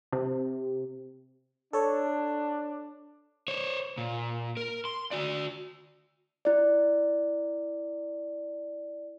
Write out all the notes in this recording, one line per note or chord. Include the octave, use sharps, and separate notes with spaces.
C3
D4 A4 C#5
C5 C#5
A#2
A#4
C6
F#4 D5
E4 D5